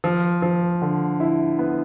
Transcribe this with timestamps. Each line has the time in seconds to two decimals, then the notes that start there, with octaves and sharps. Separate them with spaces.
0.04 F3
0.42 F3
0.82 D3
1.20 E4
1.59 B3